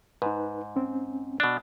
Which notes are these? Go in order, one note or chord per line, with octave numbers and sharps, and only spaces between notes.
G#2 D#4 B4
C4 C#4
B2 D4